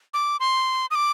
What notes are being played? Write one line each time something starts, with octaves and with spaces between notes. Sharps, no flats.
D6
C6
D#6
D6